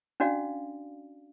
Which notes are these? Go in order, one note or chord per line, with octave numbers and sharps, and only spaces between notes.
C#4 D4 F#4 D5 F5